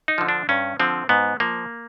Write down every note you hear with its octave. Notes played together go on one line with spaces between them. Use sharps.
D#4
D3 F3
D4
G2 C#4
D3 F3 C4
G#2 B3
F3 A#3